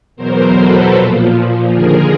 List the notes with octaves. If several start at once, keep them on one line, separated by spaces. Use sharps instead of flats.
E2 B2 F#3 A#4 C5
A4 B4
A#2 F3
D#2 D3 F3 G#4 A#4